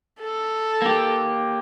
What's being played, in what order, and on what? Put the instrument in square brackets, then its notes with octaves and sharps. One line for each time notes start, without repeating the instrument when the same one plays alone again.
[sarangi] A4
[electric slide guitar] A#3 G4